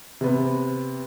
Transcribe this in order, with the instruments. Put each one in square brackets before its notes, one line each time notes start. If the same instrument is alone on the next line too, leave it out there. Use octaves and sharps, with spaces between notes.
[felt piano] C3 B3